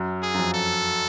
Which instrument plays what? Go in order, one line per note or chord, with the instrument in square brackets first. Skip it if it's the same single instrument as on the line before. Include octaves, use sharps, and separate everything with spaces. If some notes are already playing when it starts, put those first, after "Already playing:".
Already playing: [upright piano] F#2
[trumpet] G#4
[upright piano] F#2
F2
[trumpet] A4